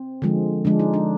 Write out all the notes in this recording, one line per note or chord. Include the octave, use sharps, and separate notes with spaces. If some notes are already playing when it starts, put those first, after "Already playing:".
Already playing: C4
D3 F3 G#3
D3 F3 G#3 D4
D#4
D4